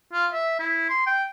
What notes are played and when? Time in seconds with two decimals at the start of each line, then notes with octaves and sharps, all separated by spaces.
0.13 F4
0.33 E5
0.59 E4
0.89 C6
1.06 G5